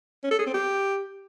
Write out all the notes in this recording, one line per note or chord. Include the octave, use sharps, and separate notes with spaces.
C#4
A4
G#4
C4
G4